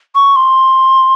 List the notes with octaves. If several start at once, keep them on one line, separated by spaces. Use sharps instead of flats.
C#6
C6